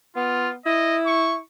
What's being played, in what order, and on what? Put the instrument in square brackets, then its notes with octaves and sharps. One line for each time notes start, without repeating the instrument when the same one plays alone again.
[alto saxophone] B3 [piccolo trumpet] F4
[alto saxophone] E4 [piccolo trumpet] D#5
[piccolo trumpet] C#6